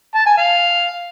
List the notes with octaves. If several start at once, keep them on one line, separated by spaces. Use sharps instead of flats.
A5
G#5
F5